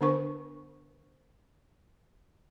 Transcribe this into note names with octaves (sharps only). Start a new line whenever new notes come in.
D3 B3 D4 A#4 C5 C#6